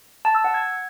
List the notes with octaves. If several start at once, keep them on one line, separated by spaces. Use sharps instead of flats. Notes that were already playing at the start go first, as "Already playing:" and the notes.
A5
E6
F#5
G#6